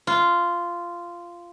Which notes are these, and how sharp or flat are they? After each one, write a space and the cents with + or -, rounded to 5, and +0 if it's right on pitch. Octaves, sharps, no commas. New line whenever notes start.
F4 -10